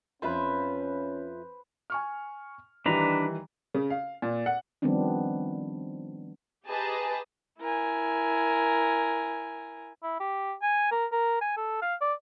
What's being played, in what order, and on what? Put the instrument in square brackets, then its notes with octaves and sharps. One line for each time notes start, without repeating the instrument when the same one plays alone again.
[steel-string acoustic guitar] F2 F4 E5 [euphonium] C#4 [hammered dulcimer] B4 C5
[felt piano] G#5 C#6 F6
[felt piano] D#3 E3 G3 [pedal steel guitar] D4 B4 A#5
[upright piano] C#3
F5
A#2
F#5
[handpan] D#3 F3 G3 B3 C4 D4
[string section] G4 G#4 B4 D#5 A5 A#5
[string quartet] E4 A#4 G#5
[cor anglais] E4
G4
G#5
A#4
A#4
G#5
A4
F5
D5